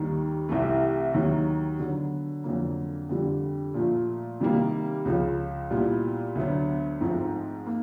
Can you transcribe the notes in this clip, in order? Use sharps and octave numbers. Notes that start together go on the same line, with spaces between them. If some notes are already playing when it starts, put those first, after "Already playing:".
Already playing: D#2 D#3 G3
C2 C3 E3 A3
D#2 D#3 F#3
D3 F#3 B3
F2 D3 F#3 A#3
F2 D3 G3
A#2 F3 A3
C3 D#3 G3 A#3
C#2 C#3 F3
A#2 G3 B3 E4
D2 D3 F#3 B3
G#2 F3 A3 C4
A#3